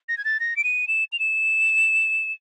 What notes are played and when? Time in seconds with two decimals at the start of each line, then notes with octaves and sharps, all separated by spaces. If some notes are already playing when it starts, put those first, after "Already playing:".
0.09 A#6
0.17 G#6
0.25 A6
0.40 A#6
0.56 D7
0.64 D#7
0.88 E7
1.12 F7
1.19 E7